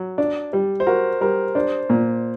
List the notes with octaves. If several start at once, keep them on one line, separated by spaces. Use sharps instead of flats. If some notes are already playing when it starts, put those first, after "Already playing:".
Already playing: F#3
D4
G3
C5
F#4 A#4
G3 A#4
D4 C5
A#2